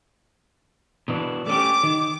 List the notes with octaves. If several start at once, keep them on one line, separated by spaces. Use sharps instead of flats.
B2 E3 D4
A3 C#4 G4 D6
D#3